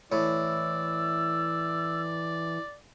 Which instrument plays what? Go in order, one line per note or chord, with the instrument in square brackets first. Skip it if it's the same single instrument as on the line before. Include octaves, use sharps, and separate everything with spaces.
[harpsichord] A2 [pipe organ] E3 [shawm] D5 [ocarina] E6